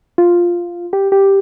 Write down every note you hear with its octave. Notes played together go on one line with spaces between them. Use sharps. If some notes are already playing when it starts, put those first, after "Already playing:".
F4
G4
G4